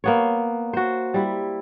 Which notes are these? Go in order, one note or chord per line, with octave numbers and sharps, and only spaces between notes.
A#3 B3 C#5
F#4 C5
G3 E4